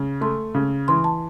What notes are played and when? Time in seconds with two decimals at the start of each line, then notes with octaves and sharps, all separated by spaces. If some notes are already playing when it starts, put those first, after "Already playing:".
Already playing: C#3
0.21 A3 C6
0.55 C#3
0.88 E3 C6
1.04 A5